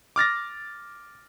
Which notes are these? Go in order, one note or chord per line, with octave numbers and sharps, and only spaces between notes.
D6 F6 A6 A#6